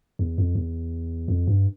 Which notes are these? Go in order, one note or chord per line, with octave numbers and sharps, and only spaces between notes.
E2
F2
E2
F2
G2